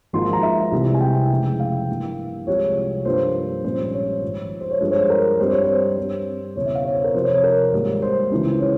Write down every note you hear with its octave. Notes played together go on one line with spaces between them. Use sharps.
G#1 G#2 F3 A#3 C6
A#5
E5
C2 C3 E3 G#3
G#5
G5
F1 F2 C#3 E3 G#3
F5
G2 E3 A#3
C2 C3 F3 G#3 C#5
G2 F3 A#3 C5
A#1 G#2 G3 A#3 C#4 C5
C#5
G#1 G#2 F3
C5
C#5
G2 F3 G#3 C5
C#5
C5
A#4
G2 G3 C4 C5
C#5
C5
G2 G3 C4
E1 E2 C#3 C#5
E5
F5
C#5
C5
A#4
F2 C3 F3 C4 C5
C#5
C#5
A#4
G#1 G#2 G3 A#3
C5
C#2 C#3 E3 G#3 C#4
C#5